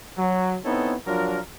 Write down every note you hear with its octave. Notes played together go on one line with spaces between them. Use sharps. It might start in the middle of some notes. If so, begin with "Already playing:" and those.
F#3
B3 C4 D#4 E4 A4 C#5
F3 F#3 D4 F4 A#4